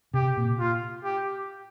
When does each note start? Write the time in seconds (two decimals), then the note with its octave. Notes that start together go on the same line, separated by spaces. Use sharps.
0.14 C3 G4
0.37 A#2
0.59 F4
1.04 G4